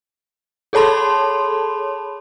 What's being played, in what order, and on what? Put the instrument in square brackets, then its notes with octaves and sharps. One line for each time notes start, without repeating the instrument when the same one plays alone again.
[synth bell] G#4 A4 C#5 A5 B5 C6